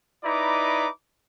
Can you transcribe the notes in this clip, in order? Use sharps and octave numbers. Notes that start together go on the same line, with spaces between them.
D#4 E4 B4 D5 A#5 D6